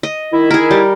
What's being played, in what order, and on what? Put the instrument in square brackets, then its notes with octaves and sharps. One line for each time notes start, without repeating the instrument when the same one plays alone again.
[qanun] D#5
[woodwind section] D#3 E4
[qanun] G#4 A#4
G3